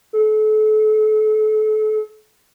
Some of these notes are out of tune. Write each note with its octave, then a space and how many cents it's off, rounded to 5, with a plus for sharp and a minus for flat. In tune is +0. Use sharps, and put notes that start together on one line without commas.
A4 -35